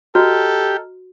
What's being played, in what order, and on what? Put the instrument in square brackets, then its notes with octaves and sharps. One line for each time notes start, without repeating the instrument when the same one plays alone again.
[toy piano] F#4 [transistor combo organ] G4 [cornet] A4 [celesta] D#5 A#5 F6